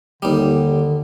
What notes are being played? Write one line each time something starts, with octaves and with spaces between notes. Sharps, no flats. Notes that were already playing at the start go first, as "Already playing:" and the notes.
D#2 D3 G3